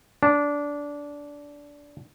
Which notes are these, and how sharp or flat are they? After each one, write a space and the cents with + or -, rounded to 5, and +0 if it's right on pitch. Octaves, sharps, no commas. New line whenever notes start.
D4 -15